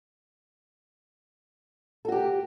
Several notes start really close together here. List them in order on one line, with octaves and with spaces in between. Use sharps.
A4 F#4 G4